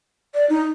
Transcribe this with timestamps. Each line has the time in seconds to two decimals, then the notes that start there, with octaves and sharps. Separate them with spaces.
0.35 D5
0.50 D#4